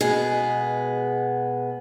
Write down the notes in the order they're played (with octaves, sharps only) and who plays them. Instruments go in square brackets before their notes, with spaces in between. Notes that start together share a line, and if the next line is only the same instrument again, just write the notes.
[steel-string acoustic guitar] B2 G#3 B3 G#4